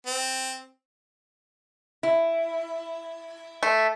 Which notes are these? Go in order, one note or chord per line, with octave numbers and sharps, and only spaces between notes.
C4
E4
A3